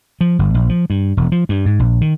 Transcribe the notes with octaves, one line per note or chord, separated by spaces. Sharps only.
F3
G1
A#1
F3
G2
E1
F3
G2
G#2
A#1
D#3